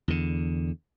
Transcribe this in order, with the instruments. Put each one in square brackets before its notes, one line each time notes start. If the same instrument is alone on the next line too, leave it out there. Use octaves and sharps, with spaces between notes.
[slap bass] E2 D3